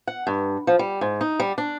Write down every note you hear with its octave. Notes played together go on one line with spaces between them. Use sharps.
F#5
G2
F3
G3
G#2
D#4
G3
D4